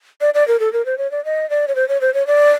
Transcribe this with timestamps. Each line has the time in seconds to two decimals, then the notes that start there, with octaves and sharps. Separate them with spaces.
0.21 D5
0.34 D5
0.48 A#4
0.60 A4
0.73 A#4
0.86 C5
0.98 C#5
1.11 D5
1.25 D#5
1.50 D5
1.68 C#5
1.76 C5
1.88 C#5
2.01 C5
2.14 C#5
2.27 D5